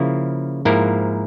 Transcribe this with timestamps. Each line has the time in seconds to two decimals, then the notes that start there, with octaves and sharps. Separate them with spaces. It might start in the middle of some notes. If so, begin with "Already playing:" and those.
Already playing: C#3 F3 A#3 E4
0.65 G#2 F3 A#3 E4 A#4